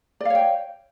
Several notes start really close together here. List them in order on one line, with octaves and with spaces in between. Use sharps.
D5 F5 C#5 G5